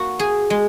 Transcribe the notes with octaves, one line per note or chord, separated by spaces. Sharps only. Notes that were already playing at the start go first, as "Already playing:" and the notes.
Already playing: A#3 F#4
G#4
G#3